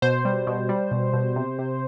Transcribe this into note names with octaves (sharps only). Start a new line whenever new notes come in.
B2 C5
G3
B2
G3
B2
B2
C3
C3